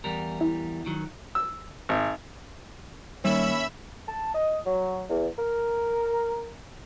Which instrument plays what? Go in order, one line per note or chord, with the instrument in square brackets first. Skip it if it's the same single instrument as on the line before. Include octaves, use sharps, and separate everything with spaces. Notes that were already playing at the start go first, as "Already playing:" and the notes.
[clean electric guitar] E2 G3 A#4
[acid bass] E4
[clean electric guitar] D#3 F#3
[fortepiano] E6
G#1
[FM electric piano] D#3 A#3 [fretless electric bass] G3 [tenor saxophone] C#4 [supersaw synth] E5 B5 E6
[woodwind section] A5
D#5
F#3
E2
A#4